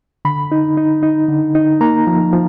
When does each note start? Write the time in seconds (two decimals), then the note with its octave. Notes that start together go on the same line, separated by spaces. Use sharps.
0.25 D3 B5
0.52 D#4
0.77 D#4
1.03 D#4
1.28 D3
1.55 D#4
1.81 A#3 A#5
2.07 F3
2.32 F3